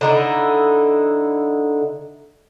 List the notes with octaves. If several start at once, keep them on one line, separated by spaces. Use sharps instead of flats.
D3 D#4 E4